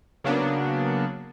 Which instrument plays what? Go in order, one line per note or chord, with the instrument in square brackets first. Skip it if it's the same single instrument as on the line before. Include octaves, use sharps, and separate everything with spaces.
[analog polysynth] C#3 F#3 A#3 B3 D4